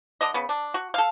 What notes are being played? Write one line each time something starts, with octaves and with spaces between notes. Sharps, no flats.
D3 D#5
C#3 B3
D4
F#4
A4 F5